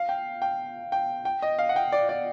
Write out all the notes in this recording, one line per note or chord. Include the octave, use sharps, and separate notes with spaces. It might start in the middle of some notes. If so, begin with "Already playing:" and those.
Already playing: F5
G5
G5
G5
G5
D#5
F5
F#5
G5
D5
D5